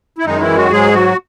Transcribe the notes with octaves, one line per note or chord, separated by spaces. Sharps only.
E4
F#2 D#3 G#3 D#4
E3 E4
F#3 F#4
G#2 F#3 G#3 G#4
F#3 F#4